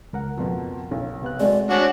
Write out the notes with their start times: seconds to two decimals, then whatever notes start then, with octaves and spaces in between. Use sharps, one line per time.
0.13 C#2 A#4 F#5
0.37 F2 B2 F3
0.91 B1
1.22 C3 B3 F#6
1.40 G#3 A3 C4 F#4 D5
1.70 D4 F#4 C#5 G#5